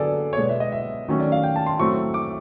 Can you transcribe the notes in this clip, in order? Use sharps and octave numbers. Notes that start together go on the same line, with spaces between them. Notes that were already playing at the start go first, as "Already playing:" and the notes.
Already playing: D3 F#3 B3 G#4 A4 D5
C#5
B2 G#3 B3 D5
E5
D#5
E5
D#3 F#3 A3 C#4
D5
F5
G5
A5
C6
A2 F#3 A3 C4 C#6
D6